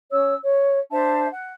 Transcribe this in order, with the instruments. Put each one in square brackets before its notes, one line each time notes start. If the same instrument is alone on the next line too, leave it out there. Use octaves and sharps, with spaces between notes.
[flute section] C#4 C#5 E6
C#5
D4 C5 E5 A5
F#5